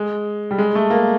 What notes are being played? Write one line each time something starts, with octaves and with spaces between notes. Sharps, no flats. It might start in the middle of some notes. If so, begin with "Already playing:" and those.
Already playing: G#3
G3
G#3
A3
A#3